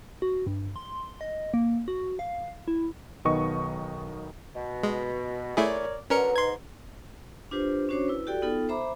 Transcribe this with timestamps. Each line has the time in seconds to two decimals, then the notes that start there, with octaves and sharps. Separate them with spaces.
0.22 F#4
0.47 G2
0.76 C6
1.21 D#5
1.54 A#3
1.88 F#4
2.19 F5
2.68 E4
3.25 B1 D#3 B3 D#5 C#6
4.55 B2
4.83 G#3
5.57 A3 E4 G#4 A#4 C#5 D5
6.10 D3 F#3 C#4 A#4 B4 A#5 C#7
6.36 G#2 C6 G#6
7.51 D4 F4 G4 B4 C5
7.89 C#4 D4 F#4 C5 C#5 D6
8.08 E4 B4
8.27 F#4 G4 A4 D5 G5
8.42 B3 D#4 F4 A4 G5
8.69 C5 E5 A#5 B5 D6